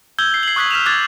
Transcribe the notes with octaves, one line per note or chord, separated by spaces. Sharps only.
E6 G6 G#6 G7
E6 C7
C7 F#7
C#6 D#6 F#6 G#6 B6 F#7
F6 B6 E7 F7
D6 F#6 G#6 A6